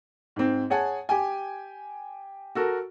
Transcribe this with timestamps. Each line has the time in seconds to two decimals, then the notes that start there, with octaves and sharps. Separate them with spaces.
0.36 G#2 C4
0.70 G#4 C#5 F#5 G#5 A5
1.09 G4 G5 G#5
2.55 F#4 A4 A#4